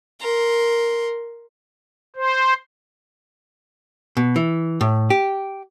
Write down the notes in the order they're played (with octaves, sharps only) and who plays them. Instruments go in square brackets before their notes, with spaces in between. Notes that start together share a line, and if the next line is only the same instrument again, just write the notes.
[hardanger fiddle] A#4 C6
[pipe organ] C5
[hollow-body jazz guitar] B2
E3
A2
G4